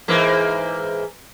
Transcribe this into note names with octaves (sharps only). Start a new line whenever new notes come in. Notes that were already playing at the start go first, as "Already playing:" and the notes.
G#2 E3 A#3